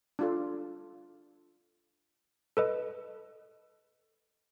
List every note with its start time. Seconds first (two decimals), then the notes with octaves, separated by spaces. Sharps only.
0.19 D4 F4 A4
2.57 A4 B4 D#5